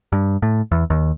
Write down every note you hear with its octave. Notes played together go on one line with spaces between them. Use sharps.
G2
A2
E2
D#2